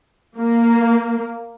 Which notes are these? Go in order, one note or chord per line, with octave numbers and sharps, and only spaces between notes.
A#3